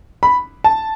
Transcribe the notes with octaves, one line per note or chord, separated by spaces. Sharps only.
B5
A5